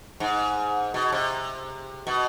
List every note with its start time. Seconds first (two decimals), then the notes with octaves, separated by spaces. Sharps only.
0.20 G#2
0.94 B2
1.12 C3
2.07 B2